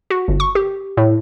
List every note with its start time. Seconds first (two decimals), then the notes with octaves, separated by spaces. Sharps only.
0.10 F#4
0.28 G1
0.40 C#6
0.55 G4
0.97 A2